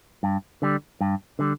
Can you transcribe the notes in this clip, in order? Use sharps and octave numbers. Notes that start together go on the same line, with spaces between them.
G2
D3 G3
G2
D3 G3